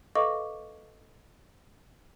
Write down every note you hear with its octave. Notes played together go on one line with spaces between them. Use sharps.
A4 B4 D#5 F5 C#6 D6